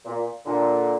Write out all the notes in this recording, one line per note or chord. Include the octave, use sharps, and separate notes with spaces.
A#2
A#2 D3